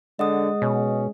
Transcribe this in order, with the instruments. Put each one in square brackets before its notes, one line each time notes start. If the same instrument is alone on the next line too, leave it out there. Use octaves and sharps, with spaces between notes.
[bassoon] D3 [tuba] G#3 [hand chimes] D#5 F#5 D#6
[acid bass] B2 [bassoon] C#4